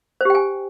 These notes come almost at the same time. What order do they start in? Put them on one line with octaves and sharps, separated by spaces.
C5 G4 G5 G#5